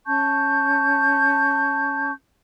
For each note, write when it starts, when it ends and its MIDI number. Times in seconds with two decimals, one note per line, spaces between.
0.06 2.11 61
0.06 2.11 81
0.06 2.11 85
0.06 2.11 91